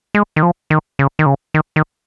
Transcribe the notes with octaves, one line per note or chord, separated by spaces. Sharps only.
G#3
D#3
F3
D#3
C#3
D#3
C#3
D#3
D#3